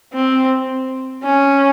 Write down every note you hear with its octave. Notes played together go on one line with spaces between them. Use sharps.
C4
C#4